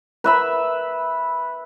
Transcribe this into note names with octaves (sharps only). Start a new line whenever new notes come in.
B4 E5 B5